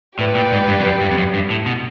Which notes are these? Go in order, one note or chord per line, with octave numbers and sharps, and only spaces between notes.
A2 G4 B4 D5
A#2
G#2
G2
F2
F#2
G2
F2
F#2
G2
A2
B2